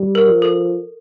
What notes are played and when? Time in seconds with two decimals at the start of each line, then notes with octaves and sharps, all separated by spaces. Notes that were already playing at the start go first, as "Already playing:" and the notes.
Already playing: G3
0.15 A#4
0.29 F3
0.42 A4